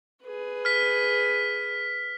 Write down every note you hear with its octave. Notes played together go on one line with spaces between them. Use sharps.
G#4 B4
F6 B6